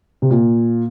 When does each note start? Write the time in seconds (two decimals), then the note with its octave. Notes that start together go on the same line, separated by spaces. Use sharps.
0.22 C3
0.30 A#2